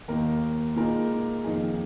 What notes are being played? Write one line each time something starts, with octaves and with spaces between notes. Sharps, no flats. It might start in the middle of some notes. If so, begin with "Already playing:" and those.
D#2 D#3 A#3 D#4 A#4
A#2 G#3 D#4 A#4
F2 D#3 A#3 D#4 G#4